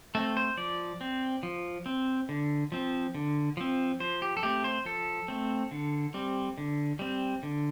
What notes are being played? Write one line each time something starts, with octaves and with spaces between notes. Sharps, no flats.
A3 C4 A4
C5
F3 D5
C4
F3
C4
D3
F3 C4
D3
F3 C4
F3 C5
G4
A4
A3 C4 G4
C5
F3 A4
A3 C4
D3
G3 C4
D3
G3 C4
D3